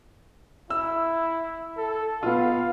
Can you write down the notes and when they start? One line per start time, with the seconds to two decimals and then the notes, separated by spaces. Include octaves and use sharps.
0.70 E4 E6
1.78 A4
2.23 B3 F4 F5